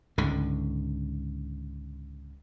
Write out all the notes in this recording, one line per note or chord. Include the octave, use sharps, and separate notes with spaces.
C#2 G#2 D3